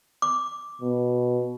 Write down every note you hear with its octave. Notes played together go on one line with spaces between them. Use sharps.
D6
B2